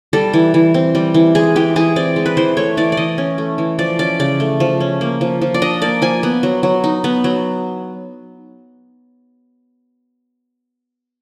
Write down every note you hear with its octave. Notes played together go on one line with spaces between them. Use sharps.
G3 A4
E3
E3
C4
G3
E3
G#3 G#4
E3 G4
E3 G#4
C4 D5
G#3
B4
E3 C5
A3 C#5
E3 D5
D5
E3 D#5
C#4
A3
E3
F3 D5
C#4 D5
C#3 D5
A3
F3
C#4
A#3
F3
F3
D5
D4 D#5
A#3 D5
F3 G#5
B3
F#3
F#3
D#4
B3
F#3